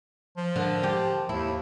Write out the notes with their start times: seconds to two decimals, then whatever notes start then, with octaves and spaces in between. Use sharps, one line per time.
0.37 F3
0.56 D3 A#4 A5
0.83 G4
1.29 D#2 E4